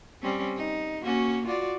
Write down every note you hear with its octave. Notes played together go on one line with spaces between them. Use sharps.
G3 C4 C#4
D#4
A#3 C#4 F#4
F4 F#4 D5